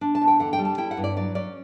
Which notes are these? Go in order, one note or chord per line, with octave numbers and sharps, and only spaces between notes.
D4
A5
E2
G5
D3 F#5
G5
G3
A5
E4 G5
F#5
G2
D5
F#3 D5
C#4 D5